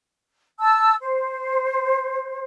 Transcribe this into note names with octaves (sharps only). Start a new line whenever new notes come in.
A5 E6
C5